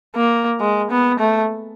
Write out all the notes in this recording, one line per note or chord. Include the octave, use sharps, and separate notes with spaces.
A#3
G#3
B3
A3